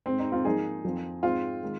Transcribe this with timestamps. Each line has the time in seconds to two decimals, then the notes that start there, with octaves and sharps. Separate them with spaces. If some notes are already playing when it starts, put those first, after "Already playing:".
0.06 G#2 G#3 C4
0.19 D#4
0.32 C4 F4
0.45 G#2 F3 A#3 D#4 G#4
0.84 F2 F3 C4
1.23 G#2 G#3 C4 F4
1.63 D#3 G#3